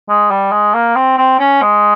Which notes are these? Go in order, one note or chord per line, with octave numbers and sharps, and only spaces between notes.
G#3
G3
G#3
A#3
C4
C4
C#4
G#3